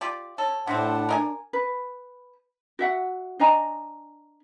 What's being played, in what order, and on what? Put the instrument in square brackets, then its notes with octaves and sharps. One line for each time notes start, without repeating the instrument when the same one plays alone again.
[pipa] F4 G4 D5
[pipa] A4 [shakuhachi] C#5
[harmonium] A2 F#5 [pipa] C3 C4 [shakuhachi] D4
[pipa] A#4 D#5 G#5
[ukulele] B4
F#4 E5 F#5
D4 D#5 G#5 A#5